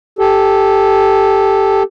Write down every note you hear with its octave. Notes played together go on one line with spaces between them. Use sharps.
G4 A4